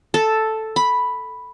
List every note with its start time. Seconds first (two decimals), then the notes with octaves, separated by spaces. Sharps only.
0.14 A4
0.76 B5